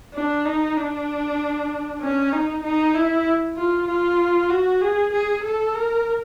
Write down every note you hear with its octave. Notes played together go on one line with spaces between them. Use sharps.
D4
D#4
D4
C#4
D#4
D#4
E4
F4
F4
F#4
G#4
G#4
A4
A#4